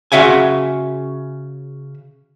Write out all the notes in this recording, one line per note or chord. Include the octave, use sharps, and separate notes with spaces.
C#3 F#4 E5 F#5 G#5